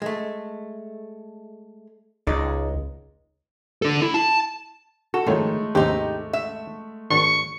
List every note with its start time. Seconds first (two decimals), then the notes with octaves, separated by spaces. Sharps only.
0.02 G#3 A3
2.27 C#2 G#3 D#4 D5
3.82 D4 A4
4.02 E4
4.14 A5
5.14 F#4 A4
5.27 G#1 F2 D#3 G#3 A3 C#5
5.75 D#2 G#2 C3 D#4 G4
6.33 E5
7.10 G#1 D4 C#6